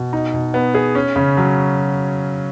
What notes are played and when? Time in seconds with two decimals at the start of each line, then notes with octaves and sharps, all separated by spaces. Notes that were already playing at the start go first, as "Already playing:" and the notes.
Already playing: B2
0.13 D#4
0.34 B2
0.54 B3
0.75 G#4
0.95 C#4
1.16 C#3
1.37 F#3